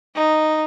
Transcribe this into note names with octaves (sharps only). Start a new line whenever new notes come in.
D#4